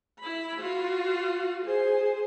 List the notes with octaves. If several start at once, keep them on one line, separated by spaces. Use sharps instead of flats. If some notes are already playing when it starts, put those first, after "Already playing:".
E4 B5
F4 F#4
G#4 C5